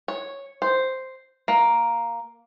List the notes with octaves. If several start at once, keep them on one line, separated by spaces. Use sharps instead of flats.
C#5
C5
A#3